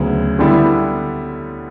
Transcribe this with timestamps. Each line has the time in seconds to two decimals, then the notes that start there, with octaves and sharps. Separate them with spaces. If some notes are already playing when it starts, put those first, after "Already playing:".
Already playing: D2 C#3 F#3 B3
0.39 D3 G3 B3 E4 A4